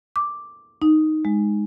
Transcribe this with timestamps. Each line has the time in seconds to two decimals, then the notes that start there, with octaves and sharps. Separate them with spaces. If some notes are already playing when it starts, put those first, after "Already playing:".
0.16 D6
0.82 D#4
1.25 G#3